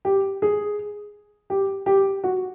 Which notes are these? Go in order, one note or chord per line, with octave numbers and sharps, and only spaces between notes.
G4
G#4
G4
G4
F#4